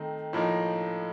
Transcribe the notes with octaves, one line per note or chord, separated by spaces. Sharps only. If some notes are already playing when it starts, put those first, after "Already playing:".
Already playing: D#3 A3 C4 D#4
A2 F3 A#3 D#4